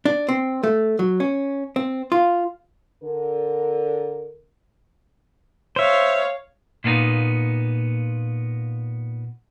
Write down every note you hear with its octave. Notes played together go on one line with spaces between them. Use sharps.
D4
C4
A3
F#3
C#4
C4
F4
D3 A#4
C5 C#5 E5 F5
A#2 A#3 B3 D4 D#4